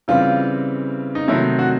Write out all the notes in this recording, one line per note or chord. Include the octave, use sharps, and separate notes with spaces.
C#3 E3 G3 C4 F4
D#4
C3 D#3 F#3 A3 E4
F#4